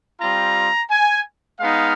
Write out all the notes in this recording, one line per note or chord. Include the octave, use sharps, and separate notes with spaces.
G3 C4 F4 A#5
G#5
G#3 B3 D#4 F5